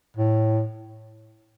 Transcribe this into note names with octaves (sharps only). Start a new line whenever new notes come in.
A2